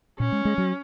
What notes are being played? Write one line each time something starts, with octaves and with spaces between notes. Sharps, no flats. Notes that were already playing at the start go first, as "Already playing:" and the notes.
A#2 C#4
G#3
G#3
F#3